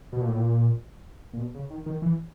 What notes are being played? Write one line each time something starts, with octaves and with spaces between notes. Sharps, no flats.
B2
A#2
A2
A#2
A#2
B2
C#3
D#3
D#3
E3